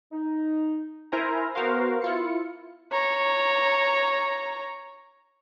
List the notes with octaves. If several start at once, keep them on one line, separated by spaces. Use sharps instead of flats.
D#4
E4 A#4 C5 G#5 A#5
B3 F#4 A#4 C5 F5
E4 F4 C#7
C#5 A#5